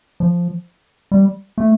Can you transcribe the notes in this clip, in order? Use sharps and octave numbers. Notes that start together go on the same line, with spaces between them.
F3
G3
A3